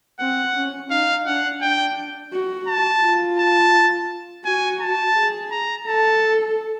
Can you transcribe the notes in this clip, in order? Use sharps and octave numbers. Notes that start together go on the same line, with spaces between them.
C4 F#5
C#4
D#4 F5
D4 F#5
D4 G5
F#4
A5
F4
A5
F#4 G#5
A5
G#4
A#5
A4 A5